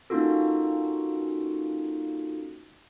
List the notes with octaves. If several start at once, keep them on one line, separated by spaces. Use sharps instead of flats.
A#3 C#4 D#4 F4 F#4 A4